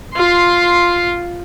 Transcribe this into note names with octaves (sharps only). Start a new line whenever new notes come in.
F4 C6